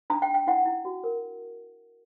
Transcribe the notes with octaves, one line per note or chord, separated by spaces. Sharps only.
D4 A#5
G5
D4
G5
E4 F#5
E4
F#4
A#4